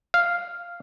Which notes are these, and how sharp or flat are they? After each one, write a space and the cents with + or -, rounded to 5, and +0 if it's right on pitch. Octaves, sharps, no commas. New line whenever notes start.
F5 -5